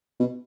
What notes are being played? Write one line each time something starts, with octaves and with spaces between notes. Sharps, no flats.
B2